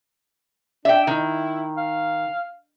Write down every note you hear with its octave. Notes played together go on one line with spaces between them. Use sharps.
D4 E5 G5
D#3 E4
F5